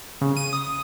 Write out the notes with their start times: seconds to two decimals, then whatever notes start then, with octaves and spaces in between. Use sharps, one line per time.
0.21 C#3
0.37 D#7
0.53 D#6